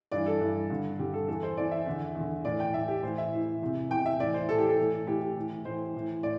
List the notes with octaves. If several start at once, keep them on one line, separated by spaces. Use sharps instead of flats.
G2 E3 D5
A4
G2 E3
G2 D3
G2 D3 G4
A4
E2 E3 A4
C5
E2 E3 D5
E5
E2 D3
E2
D3
A2 E3 D5
G5
A2 E3 E5
G4
A2 E3 C5
E5
A2 E3
E2 C3 E3
E2 C3 E3 G5
E5
A2 E3 D5
C5
A2 E3 A4
G4
A4
A2 E3
A2 E3 G4
G4
A2 E3
A2 E3 C5
A2 E3
A2 D5